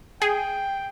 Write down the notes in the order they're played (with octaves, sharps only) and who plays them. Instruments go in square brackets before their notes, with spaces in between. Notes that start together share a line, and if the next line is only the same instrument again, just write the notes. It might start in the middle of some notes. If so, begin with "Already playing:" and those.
[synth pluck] G#4 [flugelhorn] G5